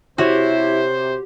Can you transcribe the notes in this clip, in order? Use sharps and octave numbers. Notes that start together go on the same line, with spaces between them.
C3 E4 F#4 G4 C5 C#5